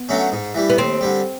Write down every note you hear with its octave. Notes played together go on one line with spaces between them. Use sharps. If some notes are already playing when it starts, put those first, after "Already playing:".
Already playing: B3
D3 F#3 A3 C#4
G#2
E3 G3
B3
D#2 C4
D3 G3